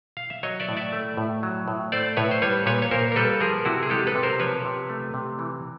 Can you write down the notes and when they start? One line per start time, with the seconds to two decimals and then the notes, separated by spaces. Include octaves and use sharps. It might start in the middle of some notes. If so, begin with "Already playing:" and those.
0.17 F5
0.30 E5
0.43 F#3 C#5 D#5
0.60 D5 E5
0.69 A2
0.77 D5 E5
0.93 A3
1.17 A2
1.43 F#3
1.68 A2
1.92 A3 C5 D5
2.17 A2 B4 C#5
2.31 C5
2.42 G3 B4 C#5
2.66 A#2 B4 C#5
2.82 C#5
2.91 A#2 A#4 C5
3.12 A#4
3.16 G3 A4 B4
3.40 F3 G#4 A#4
3.65 C3 E4 F#4
3.83 G#4
3.90 G#3 G4 A4
4.07 A4 B4
4.15 C3
4.23 A#4 C5
4.40 F3 B4 C#5
4.65 C3
4.90 A3
5.14 C3
5.39 E3